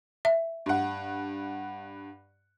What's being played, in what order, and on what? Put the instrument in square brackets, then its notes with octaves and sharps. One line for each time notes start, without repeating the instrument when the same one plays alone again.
[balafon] E5
[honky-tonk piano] G2 F#5